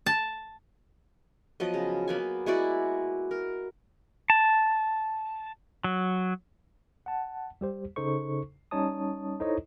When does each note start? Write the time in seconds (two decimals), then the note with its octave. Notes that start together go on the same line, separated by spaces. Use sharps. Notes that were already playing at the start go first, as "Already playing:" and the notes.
0.06 A5
1.60 F3 F#3 B3 D#5
1.74 C#3
2.08 A#3 B3 G#5
2.46 G#3 E4 F#4 D5
3.31 A#4
4.30 A5
5.84 F#3
7.06 F#5 A5
7.61 G3 G4 C5
7.96 C#3 D#4 A4 C5 C#6
8.71 G3 C#4 D#4 C#5 A5 D#6
9.40 D#4 E4 A4 C5 C#5 D#5